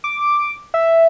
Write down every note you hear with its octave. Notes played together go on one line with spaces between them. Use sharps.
D6
E5